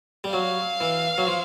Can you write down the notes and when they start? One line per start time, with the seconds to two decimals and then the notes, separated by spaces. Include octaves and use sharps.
0.24 G3
0.32 F#3 F5
0.81 E3
1.18 F#3
1.27 F3